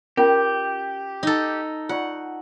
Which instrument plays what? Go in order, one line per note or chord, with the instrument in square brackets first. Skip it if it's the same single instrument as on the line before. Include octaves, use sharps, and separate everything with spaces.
[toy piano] C#4 F4 G5 [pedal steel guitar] G4 [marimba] A#4
[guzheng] D#4 A4
[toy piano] F4 D5 C#6 [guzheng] F#5